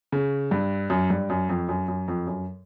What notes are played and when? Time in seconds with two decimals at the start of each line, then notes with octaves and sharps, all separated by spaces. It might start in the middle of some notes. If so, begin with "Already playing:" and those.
0.12 C#3
0.51 G2
0.90 F#2
1.10 G2
1.30 F#2
1.49 F2
1.69 F#2
1.88 F#2
2.08 F2
2.27 F#2